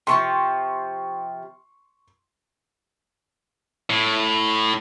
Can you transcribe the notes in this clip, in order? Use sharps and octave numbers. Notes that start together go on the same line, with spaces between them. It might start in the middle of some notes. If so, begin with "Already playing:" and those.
C3 F3 A5 C6 C#6
A2